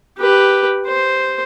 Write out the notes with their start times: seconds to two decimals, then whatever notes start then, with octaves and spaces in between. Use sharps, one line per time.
0.19 G4 B4
0.87 C5